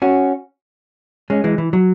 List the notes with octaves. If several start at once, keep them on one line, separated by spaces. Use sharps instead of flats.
C#4 F#4
G#3 C#4
E3 G#3
E3
F#3